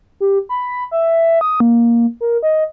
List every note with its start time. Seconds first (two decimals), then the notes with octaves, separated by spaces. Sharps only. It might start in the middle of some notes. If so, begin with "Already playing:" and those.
0.20 G4
0.49 B5
0.91 E5
1.41 D#6
1.60 A#3
2.21 A#4
2.43 D#5